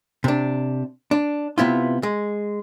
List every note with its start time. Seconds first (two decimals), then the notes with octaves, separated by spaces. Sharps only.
0.24 C3 D4
1.11 D4
1.58 C3 B3 E4 F4
2.03 G#3